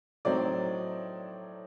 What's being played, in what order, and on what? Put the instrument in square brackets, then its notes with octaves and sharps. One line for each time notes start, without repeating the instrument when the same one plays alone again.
[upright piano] A2 F#3 C4 D#4 D5